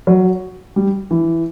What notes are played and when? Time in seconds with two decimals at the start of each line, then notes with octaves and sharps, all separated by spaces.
0.07 F#3
0.76 G3
1.11 E3